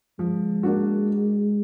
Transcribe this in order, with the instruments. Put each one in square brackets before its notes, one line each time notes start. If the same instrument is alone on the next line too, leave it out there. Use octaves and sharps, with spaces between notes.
[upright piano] F3 [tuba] G#3
[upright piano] A#3 D4 F#4